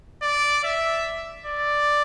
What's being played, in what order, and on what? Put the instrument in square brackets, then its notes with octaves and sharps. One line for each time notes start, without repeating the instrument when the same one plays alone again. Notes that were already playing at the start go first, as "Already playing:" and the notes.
[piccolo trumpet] D5
E5
D5